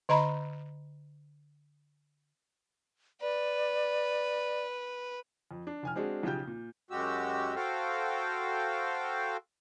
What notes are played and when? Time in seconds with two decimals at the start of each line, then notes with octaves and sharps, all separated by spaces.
0.09 D3 D#5 A#5 B5
3.21 B4 D5
5.51 F2
5.67 D4
5.83 F1 G#5 F6
5.95 G#3 C4 D4 F#4 G#4
6.23 B1 C#3 F3 G4 G5 G6
6.47 A#2
6.91 F#2 G#3 F#4 G4 E6
7.55 F#4 A4 C5 F5 G5